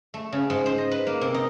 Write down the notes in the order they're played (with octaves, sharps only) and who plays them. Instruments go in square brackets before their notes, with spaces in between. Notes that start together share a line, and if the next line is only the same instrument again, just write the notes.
[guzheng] A3
C#3
G#2
C5
D#5
B4
A#3
C3
D#4